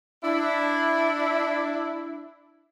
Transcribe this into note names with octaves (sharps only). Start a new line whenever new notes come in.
D4 E4